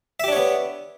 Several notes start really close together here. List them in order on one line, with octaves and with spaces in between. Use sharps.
E5 G4 D4 C#5 B3